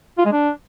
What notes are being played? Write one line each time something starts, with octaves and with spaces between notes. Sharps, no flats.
F4
G#3
D4